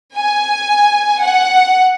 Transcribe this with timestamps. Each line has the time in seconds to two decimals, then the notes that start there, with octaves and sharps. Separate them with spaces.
0.16 G#5
1.22 F#5